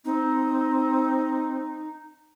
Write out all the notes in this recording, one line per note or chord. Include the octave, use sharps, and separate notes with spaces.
C4 D#4